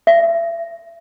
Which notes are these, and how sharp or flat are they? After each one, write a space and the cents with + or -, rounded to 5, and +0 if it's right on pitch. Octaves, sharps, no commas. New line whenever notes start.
E5 +35